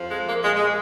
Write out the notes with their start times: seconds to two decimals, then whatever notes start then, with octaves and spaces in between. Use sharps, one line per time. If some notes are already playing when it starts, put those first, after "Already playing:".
Already playing: F2 F3
0.10 G#3
0.26 A#3
0.42 A#2 F3 G#3
0.56 G#3